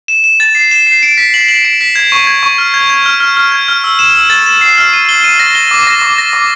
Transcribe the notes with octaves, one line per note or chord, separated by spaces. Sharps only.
E7
E7
A6
C7
E7
C7
D7
B6
F#7
F#7
D7
B6
G#6
C#6
G#6
C#6
F6
G#6
G#6
F6
F6
F6
G#6
F6
E6
E7
E6
A6
E7
C7
F6
D#7
G7
D#7
A#6
G7
D6
A#6
D6
A#6
D6